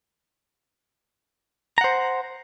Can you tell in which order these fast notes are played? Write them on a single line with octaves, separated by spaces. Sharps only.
A#5 F#5 C5